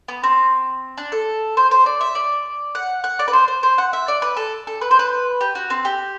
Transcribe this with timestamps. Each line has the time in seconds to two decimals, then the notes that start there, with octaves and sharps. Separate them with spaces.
0.08 B3
0.23 C4
0.98 D4
1.12 A4
1.57 C5
1.71 C5
1.86 D5
2.01 E5
2.15 D5
2.75 F#5
3.04 F#5
3.19 D5
3.28 B4
3.33 C5
3.48 C5
3.63 C5
3.78 F#5
3.93 E5
4.08 D5
4.22 B4
4.37 A4
4.67 A4
4.81 B4
4.91 C5
4.99 B4
5.41 G4
5.55 F#4
5.70 C4
5.85 G4